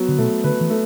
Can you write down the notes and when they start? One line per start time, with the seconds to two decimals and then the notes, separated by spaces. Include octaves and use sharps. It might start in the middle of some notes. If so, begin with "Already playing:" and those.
Already playing: F#3 B3
0.08 D3
0.18 B2 A3
0.44 D3 B4
0.61 E3
0.70 A3